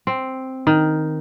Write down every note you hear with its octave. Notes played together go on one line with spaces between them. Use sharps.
C4
D#3